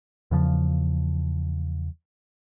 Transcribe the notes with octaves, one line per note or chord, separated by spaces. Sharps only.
E2 C#3 F3